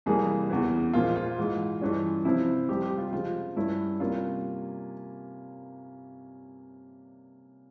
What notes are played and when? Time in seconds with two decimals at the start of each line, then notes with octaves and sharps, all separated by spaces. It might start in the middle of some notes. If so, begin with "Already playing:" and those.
0.06 F2 C3 E3 G3 A#3 G#4
0.50 E2 C#3 E3
0.94 A#2 F3 G#3 F4
1.16 F4
1.37 G#2 E3 G#3
1.81 G2 E3 G#3 C#4
2.25 C3 F3 C4 E4
2.69 F2 C3 G3 C4 G4
2.83 G4
2.98 F4
3.13 C#3 F3 G#3 F4
3.56 G2 G3 C#4 E4
4.00 C3 G3 A#3 C#4 F4